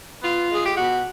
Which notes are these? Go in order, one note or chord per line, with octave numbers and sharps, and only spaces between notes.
B3 F4
G#3
G#4
G4
B2 F#4